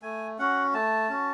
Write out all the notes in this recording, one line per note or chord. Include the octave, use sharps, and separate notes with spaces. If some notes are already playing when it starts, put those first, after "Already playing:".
A3 G#5
C#4 F#4 F#5
A3 A5
C#4 F#4